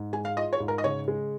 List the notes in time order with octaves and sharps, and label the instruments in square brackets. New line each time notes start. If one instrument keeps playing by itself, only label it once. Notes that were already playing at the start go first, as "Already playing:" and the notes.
Already playing: [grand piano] G#2
[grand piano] G#3 [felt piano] G#5
[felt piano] F5
[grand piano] F4 [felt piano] D#5
[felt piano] C#5
[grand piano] G#2
[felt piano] A#4
D#5
[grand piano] C#3 [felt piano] C#5
[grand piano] G#3